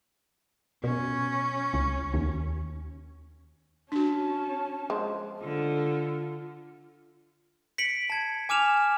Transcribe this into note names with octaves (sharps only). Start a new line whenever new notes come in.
B2 C#4
C#2
D#2
C#4 D4 F#4 A5
F3 G#3
D3 F4
B6 C#7 D7 F#7
A5 G#6
G#5 D6 F6 E7 F7